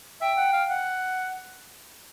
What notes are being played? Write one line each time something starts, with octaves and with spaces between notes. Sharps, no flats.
E5 G5
F#5
F5
F#5